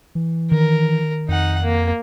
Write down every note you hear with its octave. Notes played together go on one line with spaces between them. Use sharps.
E3
D#3 A#4
F2 D#4 F#5
A#3